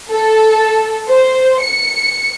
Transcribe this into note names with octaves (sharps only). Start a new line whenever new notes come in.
A4
C5
C#7